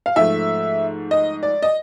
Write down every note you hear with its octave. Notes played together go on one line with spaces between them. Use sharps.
F5
G#2 F3 A3 E5
D#5
D5
D#5